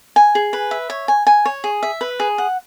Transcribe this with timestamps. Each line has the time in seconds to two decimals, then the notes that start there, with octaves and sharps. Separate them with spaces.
0.16 G#5
0.35 G#4
0.53 B4
0.71 E5
0.90 C#5
1.08 G#5
1.27 G#5
1.45 C#5
1.64 G#4
1.83 E5
2.01 B4
2.20 G#4
2.38 F#5